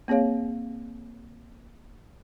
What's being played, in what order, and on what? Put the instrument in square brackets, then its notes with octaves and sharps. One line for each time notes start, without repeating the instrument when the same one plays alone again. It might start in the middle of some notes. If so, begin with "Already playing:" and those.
[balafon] A#3 C4 G#4 C#5 F5